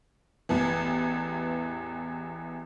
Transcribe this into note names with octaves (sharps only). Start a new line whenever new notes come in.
A1 E2 E3